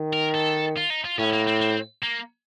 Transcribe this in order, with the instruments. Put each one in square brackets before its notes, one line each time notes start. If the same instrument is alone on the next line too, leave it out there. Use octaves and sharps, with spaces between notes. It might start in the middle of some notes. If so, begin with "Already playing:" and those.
Already playing: [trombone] D#3
[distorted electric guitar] A#4
A4
F4
D#4
F4
[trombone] A2 [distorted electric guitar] C#4
[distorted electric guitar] A#3
C4
C4
A#3